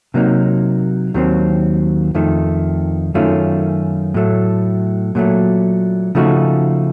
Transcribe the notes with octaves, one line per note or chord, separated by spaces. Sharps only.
C3 F#3 A#3 D#4
D#2 D#3 F#3 C4
F2 D#3 A3
F#2 D#3 A3 C#4 F4
A2 F#3 A3
A#2 F#3 A3
C#3 F3 A3 D#4 F#4